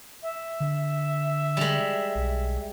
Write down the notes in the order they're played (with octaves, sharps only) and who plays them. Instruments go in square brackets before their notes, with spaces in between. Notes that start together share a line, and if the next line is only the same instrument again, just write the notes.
[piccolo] E5
[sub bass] D3
[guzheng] G3 G#3
[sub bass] B1